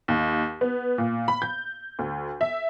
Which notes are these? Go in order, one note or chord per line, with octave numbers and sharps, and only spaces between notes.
D#2
B3
A#2
B5
G6
D2
E5